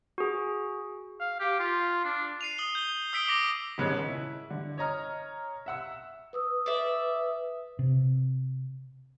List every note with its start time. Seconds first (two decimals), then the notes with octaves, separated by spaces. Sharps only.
0.18 F#4 G#4
1.20 F5
1.40 G4
1.59 F4
2.04 D4
2.41 C7 D#7 F7
2.58 D#6 F7 G7
2.75 G6 G7
3.13 D#6 E6 B6 C7 D7 G7
3.28 D6 D#6 A#6 D7 F#7
3.78 D#1 G#2 C#3 G#3 C#5 F#6
4.08 E4
4.50 D3
4.78 C#5 D#5 A#5 F6
5.66 E5 F#5 E6
6.33 B4 D#6 E6
6.66 D5 E5
7.79 C3